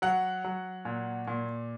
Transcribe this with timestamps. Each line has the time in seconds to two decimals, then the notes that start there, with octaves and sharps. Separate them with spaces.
0.02 F#3 F#5
0.44 F#3
0.85 A#2
1.27 A#2